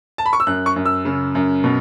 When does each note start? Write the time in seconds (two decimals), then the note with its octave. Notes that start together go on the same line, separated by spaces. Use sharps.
0.18 A5
0.26 B5
0.33 C#6
0.40 E6
0.47 F#2 F#6
0.66 C#6
0.76 F#2
0.86 E6
1.05 C#3
1.35 F#2
1.64 B2